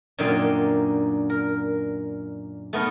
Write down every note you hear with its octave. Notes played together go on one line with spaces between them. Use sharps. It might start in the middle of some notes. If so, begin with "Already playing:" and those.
F#2 A#2 D3 D#4 G5 C6
A#4
A3 B3 D#4 A#4